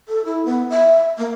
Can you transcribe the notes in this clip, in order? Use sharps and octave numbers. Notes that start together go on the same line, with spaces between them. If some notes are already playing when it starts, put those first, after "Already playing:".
A4
E4
B3
E5
A#3